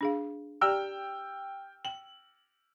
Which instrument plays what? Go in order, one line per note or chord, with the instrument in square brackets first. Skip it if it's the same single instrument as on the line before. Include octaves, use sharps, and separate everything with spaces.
[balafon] D4 G#4 F5
[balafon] G4 D5 A#5 [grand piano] G5 E6 F6
[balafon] G5 [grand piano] F#7